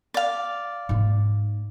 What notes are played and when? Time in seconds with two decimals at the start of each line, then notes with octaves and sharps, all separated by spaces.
0.14 D5 F5
0.89 G#2 A#3